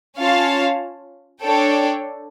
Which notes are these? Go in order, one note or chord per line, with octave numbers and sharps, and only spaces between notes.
C#4 F4 C#5 F5 A5
D4 A4 C#5 G5